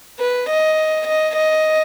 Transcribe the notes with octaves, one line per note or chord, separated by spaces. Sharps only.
B4
D#5
D#5
D#5